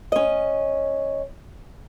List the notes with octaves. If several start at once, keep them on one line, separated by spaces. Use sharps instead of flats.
C#4 D#5